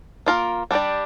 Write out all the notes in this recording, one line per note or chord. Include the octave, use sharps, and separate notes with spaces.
A#3 F4 A#4
G3 D4 G4 D5